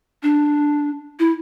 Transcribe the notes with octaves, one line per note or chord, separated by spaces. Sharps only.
D4
E4